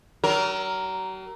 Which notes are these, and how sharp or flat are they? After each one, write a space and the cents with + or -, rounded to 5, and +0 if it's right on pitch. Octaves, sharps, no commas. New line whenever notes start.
F#3 +45 A#4 +0